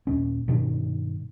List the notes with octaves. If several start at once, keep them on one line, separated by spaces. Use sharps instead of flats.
D#1 C#4
G2 B2 D#3